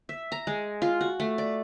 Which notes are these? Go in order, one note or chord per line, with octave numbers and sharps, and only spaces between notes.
E5
A#5
G#3
F4
F#4
A3
D5